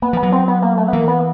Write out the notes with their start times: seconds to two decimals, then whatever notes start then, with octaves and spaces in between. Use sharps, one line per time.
0.02 A#3 B3
0.13 F3 B3
0.23 F#3
0.32 C4
0.48 B3
0.62 A#3
0.77 A3
0.88 B3
0.93 E3 A#3
1.08 B3